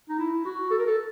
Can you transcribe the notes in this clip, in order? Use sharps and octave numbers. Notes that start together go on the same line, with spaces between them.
D#4
E4
F#4
A4
A#4
A4